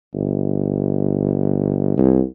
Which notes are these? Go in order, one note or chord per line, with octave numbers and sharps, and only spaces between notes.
G1
C2